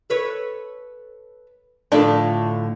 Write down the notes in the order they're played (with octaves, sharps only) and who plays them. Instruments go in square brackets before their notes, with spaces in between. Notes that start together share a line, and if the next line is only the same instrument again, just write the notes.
[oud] A4 B4 C#5
[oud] A2 D3 F3 [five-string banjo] D4 A4